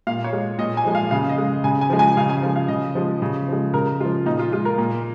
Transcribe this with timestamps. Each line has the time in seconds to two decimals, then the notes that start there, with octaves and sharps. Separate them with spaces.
0.07 A#2 F5
0.24 C#5
0.33 G#3
0.59 A#2 D#5
0.77 G#5
0.85 F3 G#3
0.95 F5
1.11 C#3 F5
1.29 D#5
1.38 G#3
1.64 C#3 G#5
1.81 G#5
1.90 F3 G#3
1.99 G#5
2.17 C#3 F5
2.29 G#5
2.43 F3 G#5
2.45 G#3
2.56 F5
2.68 C#3 D#5
2.95 F3 G#3
3.22 C#3
3.48 F3 G#3
3.74 C#3 A#4
4.00 G#3 F4
4.05 F3
4.26 A#2 D#4
4.39 F4
4.52 G#3 F4
4.65 A#4
4.78 A#2